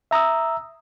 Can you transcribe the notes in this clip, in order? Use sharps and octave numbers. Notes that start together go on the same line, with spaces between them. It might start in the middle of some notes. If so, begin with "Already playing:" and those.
E5 A#5 D#6 E6